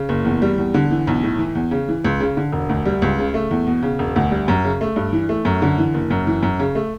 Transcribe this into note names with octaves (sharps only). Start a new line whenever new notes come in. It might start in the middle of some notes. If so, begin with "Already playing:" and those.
Already playing: C#3
F#1
E2
G3
E2
D3
E3
B1
A2
E3
E2
C#3
E3
C#2
C#3
D3
E1
D2
G3
C#2
C#3
A3
E2
B2
C#3
E1
D2
G3
F#2
C#3
A3
G2
E3
A3
F#2
D3
E3
F#1
F#2
E3
F#2
C#3
A3